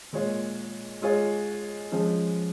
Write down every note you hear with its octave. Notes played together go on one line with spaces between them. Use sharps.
A#2 G#3 F4 C#5
G#3 F4 G#4 C#5
F3 G#3 C#4 G#4